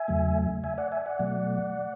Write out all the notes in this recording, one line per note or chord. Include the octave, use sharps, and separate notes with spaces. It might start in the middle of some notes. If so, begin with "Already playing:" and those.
Already playing: E5 G#5
E2 C#3 F#3 A3
E5 G#5
D5 F#5
E5 G#5
D5 F#5
B2 F#3 A3